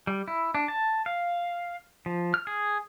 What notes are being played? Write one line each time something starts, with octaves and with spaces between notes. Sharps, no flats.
G3
E4
D4
A5
F5
F3
F6
G#4